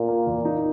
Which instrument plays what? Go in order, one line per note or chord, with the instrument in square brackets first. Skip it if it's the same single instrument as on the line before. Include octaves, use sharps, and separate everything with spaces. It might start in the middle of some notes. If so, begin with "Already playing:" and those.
Already playing: [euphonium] A#2
[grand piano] A#3
E2
D#4